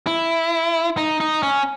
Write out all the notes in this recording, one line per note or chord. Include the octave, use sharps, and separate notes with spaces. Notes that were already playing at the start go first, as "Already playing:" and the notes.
E4
D#4
D#4
C#4